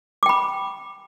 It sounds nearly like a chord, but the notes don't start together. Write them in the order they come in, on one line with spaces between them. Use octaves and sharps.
D6 G5 B5